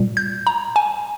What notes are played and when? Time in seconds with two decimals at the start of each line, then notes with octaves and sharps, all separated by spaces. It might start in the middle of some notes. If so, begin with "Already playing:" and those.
Already playing: A#2 G3
0.17 G6
0.47 A#5
0.76 G#5